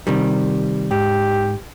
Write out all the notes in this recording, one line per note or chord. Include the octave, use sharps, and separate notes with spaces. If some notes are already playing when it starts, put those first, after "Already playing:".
C3 D#3 G3
G#2 G4